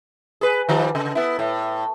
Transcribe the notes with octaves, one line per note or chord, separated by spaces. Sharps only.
G#4 B4
D#3 F3 G3
C#3
B3 E4
A2